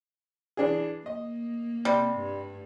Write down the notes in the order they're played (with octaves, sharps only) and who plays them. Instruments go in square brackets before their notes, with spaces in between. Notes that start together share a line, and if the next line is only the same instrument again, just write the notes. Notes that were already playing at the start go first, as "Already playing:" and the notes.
[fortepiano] E3 D4 G#4
[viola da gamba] A#3 [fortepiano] D#5
[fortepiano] C3 [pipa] G3
[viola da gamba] G2